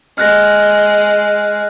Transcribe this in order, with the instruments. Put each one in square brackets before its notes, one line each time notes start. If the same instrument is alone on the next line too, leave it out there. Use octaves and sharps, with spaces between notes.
[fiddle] G#3 [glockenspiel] F6 F#6 A#6